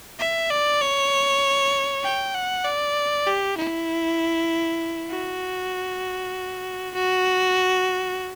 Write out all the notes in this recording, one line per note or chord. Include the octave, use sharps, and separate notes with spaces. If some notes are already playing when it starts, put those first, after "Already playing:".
E5
D5
C#5
G5
F#5
D5
G4
E4
F#4
F#4